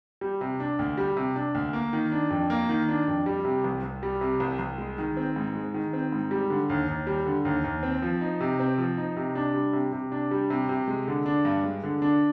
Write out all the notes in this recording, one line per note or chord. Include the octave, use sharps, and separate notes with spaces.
G3
C3
D4
D2
G3
C3
D4
D2
A#3
D#3
D4
F2
A#3
D#3
D4
F2
G3
C3
C2
C2
G3
C3
C2
C2
G#3
D#3
C4
G#2
G#3
D#3
C4
G#2
G3
D3
D#2
D#2
G3
D3
D#2
D#2
C4
F3
D#4
C3
C4
F3
D#4
C3
D4
G3
C3
C3
D4
G3
C3
C3
G#3
D3
D4
G2
G#3
D3
D4